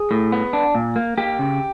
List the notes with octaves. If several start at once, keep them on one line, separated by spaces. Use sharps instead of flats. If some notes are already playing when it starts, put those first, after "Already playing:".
Already playing: G#4
A2
B3
D4
A#2
A#3
A#3 G4
C#3